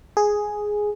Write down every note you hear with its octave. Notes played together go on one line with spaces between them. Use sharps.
G#4